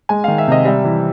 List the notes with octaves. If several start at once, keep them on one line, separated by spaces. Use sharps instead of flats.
G#3 G#5
D#3 F5
E5
C3 D#5
G3 E5
E3